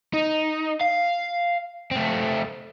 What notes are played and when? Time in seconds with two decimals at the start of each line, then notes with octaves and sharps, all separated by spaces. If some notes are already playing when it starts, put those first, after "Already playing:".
0.13 D#4
0.81 F5
1.91 A3 C4